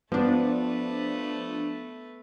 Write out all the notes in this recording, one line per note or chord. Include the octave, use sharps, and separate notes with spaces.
F3 A3 B3 D4 B4